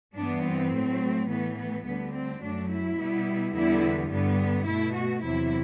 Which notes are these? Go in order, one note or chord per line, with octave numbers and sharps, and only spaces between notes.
G2 E3 B3 D4
C4
A2 F#3 A3
A2 E3 A3 B3
B3
D2 D3 G3 B3
C4
F#2 F#3 A3 D4
E4
B2 G3 B3
E2 D3 G3 B3 E4
G2 D3 G3 B3
B2 A3 E4
F#4
E2 C3 F#3 E4